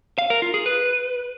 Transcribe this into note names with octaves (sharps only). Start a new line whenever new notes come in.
F5
A#4
F4
G#4
B4